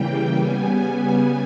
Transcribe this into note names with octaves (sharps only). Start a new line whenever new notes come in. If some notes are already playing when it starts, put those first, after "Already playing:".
Already playing: C#3 E3 G3 A#3 G5
C#3 G3 B3 G#5